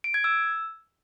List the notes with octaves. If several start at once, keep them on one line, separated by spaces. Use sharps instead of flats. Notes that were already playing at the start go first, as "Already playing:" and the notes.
D7
G#6
E6